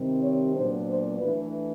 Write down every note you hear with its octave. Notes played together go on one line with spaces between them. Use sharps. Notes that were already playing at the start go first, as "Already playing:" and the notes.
Already playing: C3 D#3 G3 C4
C#5
A#2 F#3 B3 D4 C5
C5
E3 A3 D4 B4